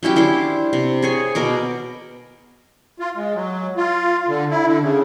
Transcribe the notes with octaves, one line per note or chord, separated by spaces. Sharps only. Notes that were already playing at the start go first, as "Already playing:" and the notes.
F#3 C#4 E4 G4
D4 E4 C5 D6
C3
G#4 C#5 G#5
B2 A#4 D6
F4
G#3
F#3
F4
D3
E4
D3
C#3